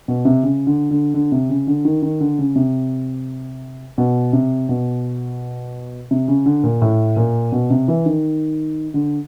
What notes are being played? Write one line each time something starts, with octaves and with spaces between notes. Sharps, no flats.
B2
C3
C#3
D3
D3
D3
C3
C#3
D3
D#3
D#3
D3
C#3
C3
B2
C3
B2
C3
C#3
D3
A#2
A2
A#2
B2
C3
E3
D#3
D3